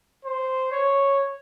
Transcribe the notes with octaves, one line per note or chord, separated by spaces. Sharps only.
C5
C#5